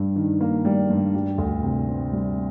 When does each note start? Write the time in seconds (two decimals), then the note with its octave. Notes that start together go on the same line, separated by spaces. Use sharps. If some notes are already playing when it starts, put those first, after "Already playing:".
Already playing: G2 G3
0.16 D#3
0.41 A#3
0.65 G3
0.90 G2
1.14 G3
1.38 D2
1.63 C3
1.88 C4
2.12 G3